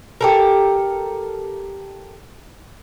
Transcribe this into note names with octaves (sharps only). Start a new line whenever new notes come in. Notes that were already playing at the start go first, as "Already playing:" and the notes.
G4 A4 A#4